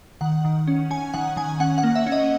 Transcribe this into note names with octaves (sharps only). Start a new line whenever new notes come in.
D#3 F#5
D#3
C#4
C#4 G#5
D#3 F#5
D#3 G#5
C#4 F#5
F#5
A#3
E5
C#4
D#5